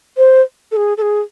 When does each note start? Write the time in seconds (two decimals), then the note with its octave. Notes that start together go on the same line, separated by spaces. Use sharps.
0.17 C5
0.72 A4
0.76 G#4
0.98 A4
1.02 G#4